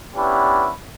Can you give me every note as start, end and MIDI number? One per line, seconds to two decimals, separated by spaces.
0.16 0.69 59
0.16 0.69 61
0.16 0.69 62
0.16 0.69 64
0.16 0.69 67
0.16 0.69 71